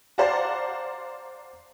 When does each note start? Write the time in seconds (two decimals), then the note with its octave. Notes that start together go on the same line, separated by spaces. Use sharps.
0.18 C5 D5 F5 F#5 A5 A#5